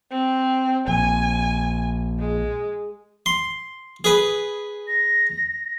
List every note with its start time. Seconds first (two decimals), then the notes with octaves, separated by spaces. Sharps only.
0.11 C4
0.88 A#1 G#5
2.19 G#3
3.26 C6
4.04 G#4 B4
4.88 A#6